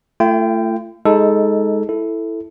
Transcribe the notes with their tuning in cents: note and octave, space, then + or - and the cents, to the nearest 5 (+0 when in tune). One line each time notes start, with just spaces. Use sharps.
A3 +20 F4 -45 G5 +0
G#3 +0 D#4 +20 A4 +0
E4 +0 A4 +0